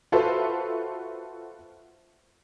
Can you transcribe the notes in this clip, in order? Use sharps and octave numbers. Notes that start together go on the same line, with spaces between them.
F4 F#4 A4 B4 C5 E5